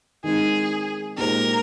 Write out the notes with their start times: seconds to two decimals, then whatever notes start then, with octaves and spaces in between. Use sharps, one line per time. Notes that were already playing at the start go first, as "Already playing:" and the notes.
0.24 D#3 G#3 C4 D#4 G#4
1.18 A#2 G#3 D#4 G4 A#4 C5